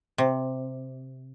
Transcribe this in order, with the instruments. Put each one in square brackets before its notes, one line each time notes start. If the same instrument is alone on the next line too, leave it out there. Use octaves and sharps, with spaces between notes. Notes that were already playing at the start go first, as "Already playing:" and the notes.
[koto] C3